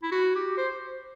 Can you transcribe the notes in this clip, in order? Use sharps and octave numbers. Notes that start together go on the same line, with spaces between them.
E4
F#4
G4
C5